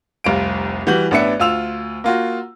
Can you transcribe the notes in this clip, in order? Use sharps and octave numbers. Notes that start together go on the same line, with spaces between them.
F1 C2 F5 D7
E3 G3 F#4 G6 F#7
A1 B3 D4 B4 E5 C#7
D2 F4 E6 F7
A#3 F4 F#4